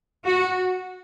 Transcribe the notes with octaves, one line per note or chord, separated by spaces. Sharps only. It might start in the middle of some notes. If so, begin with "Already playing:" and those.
F#4